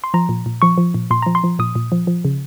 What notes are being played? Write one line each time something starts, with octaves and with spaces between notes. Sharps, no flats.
C6
F3 A#5
A#2
A#2
F3 C#6
F3
A#2
A#2 C6
F3 A#5
C6
F3
A#2 D#6
A#2
F3
F3
C#3